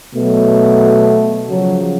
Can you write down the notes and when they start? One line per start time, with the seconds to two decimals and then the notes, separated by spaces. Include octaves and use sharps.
0.15 B2 F#3 A3
1.48 C#3 F3 F#3